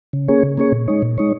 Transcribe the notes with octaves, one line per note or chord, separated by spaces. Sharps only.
C#3
A#3 C#4 G#4 C#5
C#3
A#3 C#4 G#4 C#5
A#2
G#3 D#4 C#5
A#2
G#3 D#4 C#5